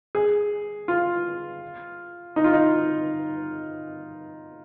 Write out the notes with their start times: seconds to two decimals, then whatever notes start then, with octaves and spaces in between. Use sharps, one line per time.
0.15 G#4
0.88 F4
2.36 D#4
2.44 F4
2.53 D#4